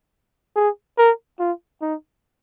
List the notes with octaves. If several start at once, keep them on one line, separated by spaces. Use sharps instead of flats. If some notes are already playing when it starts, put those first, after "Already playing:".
G#4
A#4
F4
D#4